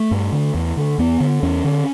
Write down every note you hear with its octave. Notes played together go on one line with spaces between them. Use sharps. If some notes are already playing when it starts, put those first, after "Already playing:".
Already playing: A3
G2
D3
E2
D3
E2 B3
D3
E2 C#4
D3